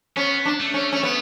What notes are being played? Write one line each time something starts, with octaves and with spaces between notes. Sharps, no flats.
B3 C#4
D4
A3
C#4
C#4
B3